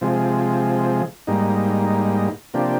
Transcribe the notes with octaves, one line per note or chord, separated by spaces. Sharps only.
C3 F3 G#3
G#2 G3 A#3 D#4
C3 F3 A#3 D4 G4